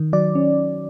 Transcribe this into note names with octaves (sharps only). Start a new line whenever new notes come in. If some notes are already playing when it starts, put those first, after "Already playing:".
Already playing: D#3
F#3 D5
C#4